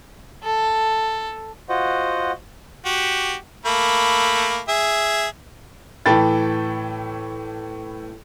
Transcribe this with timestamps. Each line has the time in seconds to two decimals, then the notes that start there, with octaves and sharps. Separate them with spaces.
0.43 A4
1.69 F4 F#4 C5 D#5 F#5
2.85 F#4 G4
3.66 A3 A#3 B5
4.68 G#4 E5
6.06 A2 E3 A4 G5 B5 A6